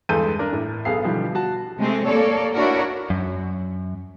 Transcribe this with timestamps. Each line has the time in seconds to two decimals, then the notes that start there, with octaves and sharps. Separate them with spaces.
0.09 E2 G2 G#3 A4 G6 D#7
0.39 D4 A#4
0.53 A2
0.85 B1 B3 G#4 A4 F5 C7
1.04 B2 D3 E3 F3 G3
1.35 F#4 A5
1.79 C3 G#3 A3 C4
2.08 A#3 A4 C#5 D5
2.54 D4 E4 F#4 A#4 C#5 D5
3.10 F#2